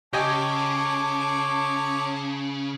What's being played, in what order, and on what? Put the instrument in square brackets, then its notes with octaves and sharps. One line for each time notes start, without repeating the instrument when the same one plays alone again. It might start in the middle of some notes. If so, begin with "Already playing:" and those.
[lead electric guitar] C#3 [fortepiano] G4 D#5 G#5 [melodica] C#5 D6 [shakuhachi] A5